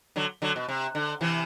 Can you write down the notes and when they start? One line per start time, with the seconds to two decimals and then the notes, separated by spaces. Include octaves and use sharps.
0.16 D3 F#3
0.42 D3 F#3
0.56 B2
0.68 C3
0.95 D3
1.21 C3 E3